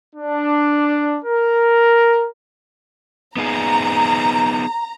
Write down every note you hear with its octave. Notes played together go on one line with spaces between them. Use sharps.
D4
A#4
B3 D#4 G#4 A#5